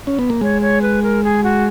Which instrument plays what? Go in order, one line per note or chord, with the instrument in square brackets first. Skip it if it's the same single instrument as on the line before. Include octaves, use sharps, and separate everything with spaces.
[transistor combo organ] C#4
B3
A#3
[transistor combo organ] G#3 [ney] C#5
[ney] C#5
B4
A#4
G#4
F#4